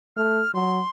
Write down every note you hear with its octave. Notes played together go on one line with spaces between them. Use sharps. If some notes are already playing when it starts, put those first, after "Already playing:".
A3 F6
F#3 C6